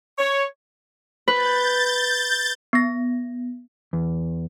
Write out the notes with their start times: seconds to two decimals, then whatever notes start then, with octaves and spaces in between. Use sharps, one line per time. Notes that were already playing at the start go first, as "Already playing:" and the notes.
0.18 C#5
1.28 B4 G6 A6
2.73 B3 A#6
3.93 E2